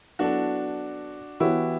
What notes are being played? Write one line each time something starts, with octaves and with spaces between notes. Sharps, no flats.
F#3 B3 D4 E4 F#4 A4
E3 B3 E4 F#4 G4 C#5